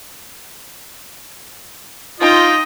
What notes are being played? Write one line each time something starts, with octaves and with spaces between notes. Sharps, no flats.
D#4 F4 D#5 G5